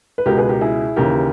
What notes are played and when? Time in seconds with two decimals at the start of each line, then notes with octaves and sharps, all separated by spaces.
0.18 B4
0.26 C#2 B2 G4 A#4
0.38 G#4 B4
0.49 G4 A#4
0.61 E4 G#4
0.96 D#2 C#3 E3 G4 A#4